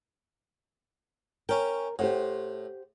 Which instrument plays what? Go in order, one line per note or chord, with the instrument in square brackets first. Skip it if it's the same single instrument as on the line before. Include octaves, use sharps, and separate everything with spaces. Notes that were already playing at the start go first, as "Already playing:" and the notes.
[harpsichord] C#4 G5 [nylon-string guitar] A#4
[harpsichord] A2 [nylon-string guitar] G4 C5 F#5